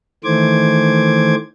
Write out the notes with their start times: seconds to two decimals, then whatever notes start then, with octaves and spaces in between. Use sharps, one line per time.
0.24 D#3 E3 A3 C5 D6 G#6